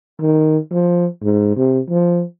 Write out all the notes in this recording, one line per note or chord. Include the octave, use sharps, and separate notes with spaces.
D#3
F3
G#2
C3
F3